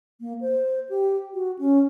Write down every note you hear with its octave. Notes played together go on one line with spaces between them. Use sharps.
A#3
C5
G4
F#4
C#4